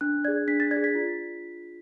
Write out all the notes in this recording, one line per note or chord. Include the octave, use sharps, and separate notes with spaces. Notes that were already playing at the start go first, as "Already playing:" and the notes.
D4 F#6
G#4 D5 G#6
D4 B6
A6
D5 G#6
G#4
B6
F4